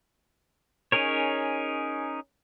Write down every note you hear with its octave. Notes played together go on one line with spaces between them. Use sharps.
C#4 D#4 G#4 A#4 C#5